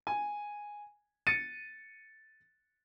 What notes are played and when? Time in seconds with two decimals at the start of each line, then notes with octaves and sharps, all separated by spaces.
0.07 G#5
1.27 A6 C#7 D#7